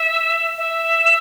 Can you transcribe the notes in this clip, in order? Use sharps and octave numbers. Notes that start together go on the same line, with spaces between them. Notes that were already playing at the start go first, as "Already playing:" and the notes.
Already playing: E5
E5